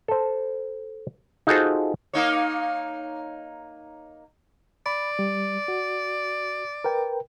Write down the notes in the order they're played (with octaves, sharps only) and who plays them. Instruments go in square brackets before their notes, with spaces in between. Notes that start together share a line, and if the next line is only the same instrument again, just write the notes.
[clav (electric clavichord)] A4 C5
D#4 F4 F#4 G#4 A4 C5
[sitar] A#3 D#4 C#5
[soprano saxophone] D5 [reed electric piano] B5
[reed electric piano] G3
F#4
A#4 B4 G5